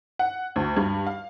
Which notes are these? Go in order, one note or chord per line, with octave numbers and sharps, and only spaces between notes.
F#5
D2
G2
F5